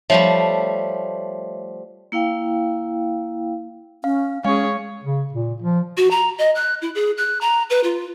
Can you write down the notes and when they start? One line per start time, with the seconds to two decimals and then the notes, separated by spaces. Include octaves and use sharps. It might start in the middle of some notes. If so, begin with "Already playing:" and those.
0.10 F3 G3 A3 C#5 E5
2.12 A#3 E4 F5 G5
4.04 C#4 F5
4.44 G#3 C#4 G#4 C#5 F5 G#5 C#6
5.04 C#3
5.33 A#2
5.62 F3
5.97 F#4
6.11 A#5
6.38 D#5
6.55 F#6
6.82 E4
6.95 G#4
7.17 F#6
7.41 A#5
7.70 B4
7.84 F4